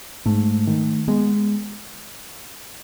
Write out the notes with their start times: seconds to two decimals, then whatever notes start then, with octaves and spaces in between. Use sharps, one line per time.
0.26 G#2 A3
0.67 D#3
1.08 G#3 B3